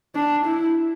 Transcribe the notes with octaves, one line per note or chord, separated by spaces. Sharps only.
D4
E4